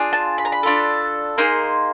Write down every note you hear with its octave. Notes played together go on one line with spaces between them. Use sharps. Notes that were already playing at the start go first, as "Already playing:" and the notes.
Already playing: D4 F4 G#4
A5
B5
A#5
B5
D4 F4 A4
A#3 D#4 G#4 C6